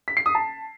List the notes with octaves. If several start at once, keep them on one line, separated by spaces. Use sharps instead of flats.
B6
C7
D#6
A5